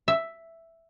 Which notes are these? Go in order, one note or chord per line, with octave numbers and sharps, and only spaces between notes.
E5